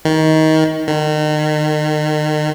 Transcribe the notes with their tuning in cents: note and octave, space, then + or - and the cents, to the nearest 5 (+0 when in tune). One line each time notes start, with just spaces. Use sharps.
D#3 +20
D#3 -35